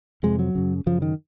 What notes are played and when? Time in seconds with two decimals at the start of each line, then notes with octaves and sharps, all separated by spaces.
0.23 F2 C3 G#3
0.39 F#3
0.55 F#2 C#3
0.86 F#2 C#3 F3
1.02 D#3